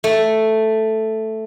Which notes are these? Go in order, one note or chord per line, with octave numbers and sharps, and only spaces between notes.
A3